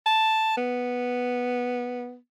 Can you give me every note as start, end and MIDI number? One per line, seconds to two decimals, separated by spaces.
0.06 0.53 81
0.57 2.16 59